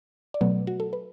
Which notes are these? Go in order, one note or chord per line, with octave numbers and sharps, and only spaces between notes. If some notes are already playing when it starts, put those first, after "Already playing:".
D5
B2 F#3 A3 B3 B4
F#4
A4
B4